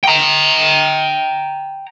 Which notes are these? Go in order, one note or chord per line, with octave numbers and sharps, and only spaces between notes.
G5 A#5